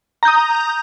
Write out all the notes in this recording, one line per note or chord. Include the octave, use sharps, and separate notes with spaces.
A#5 D#6 G6